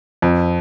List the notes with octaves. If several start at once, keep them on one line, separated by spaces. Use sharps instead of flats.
F2